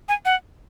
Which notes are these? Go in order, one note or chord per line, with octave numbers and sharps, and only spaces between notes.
G#5
F#5